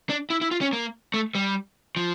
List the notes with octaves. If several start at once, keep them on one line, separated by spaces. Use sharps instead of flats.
D4
E4
E4
F4
C#4
A#3
A3
G3
F3